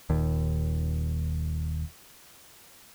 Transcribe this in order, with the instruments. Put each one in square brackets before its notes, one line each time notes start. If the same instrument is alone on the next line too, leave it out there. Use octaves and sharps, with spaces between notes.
[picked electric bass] D#1 D#2